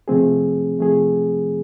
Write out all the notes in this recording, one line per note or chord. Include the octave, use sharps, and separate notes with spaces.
C3 F3 A3 C4 G#4
C3 F3 A3 C4 G#4